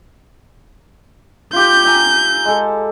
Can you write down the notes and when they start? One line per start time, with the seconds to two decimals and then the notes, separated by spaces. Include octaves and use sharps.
1.53 F4 G4 G6
1.85 E5 G#5 A#5
2.45 G#3 A4